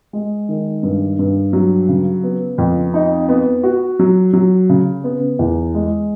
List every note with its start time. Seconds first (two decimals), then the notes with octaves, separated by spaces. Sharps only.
0.13 G#3
0.49 D#3
0.83 G2
1.19 G2
1.53 F#3
1.89 C#3
2.24 B3
2.58 F2
2.94 D#4
3.29 B3
3.63 F#4
3.99 F#3
4.33 F#3
4.69 C#3
5.04 B3
5.39 E2
5.74 G#3